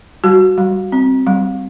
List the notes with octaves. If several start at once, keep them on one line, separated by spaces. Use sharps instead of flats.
G3 F#4
G3
C4
G3